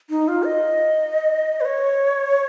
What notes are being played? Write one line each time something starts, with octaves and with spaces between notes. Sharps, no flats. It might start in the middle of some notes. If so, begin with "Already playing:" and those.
D#4
F4
D#5
B4
C#5